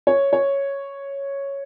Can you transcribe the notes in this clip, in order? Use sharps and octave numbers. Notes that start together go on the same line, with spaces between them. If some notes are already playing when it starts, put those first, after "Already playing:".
C#5
C#5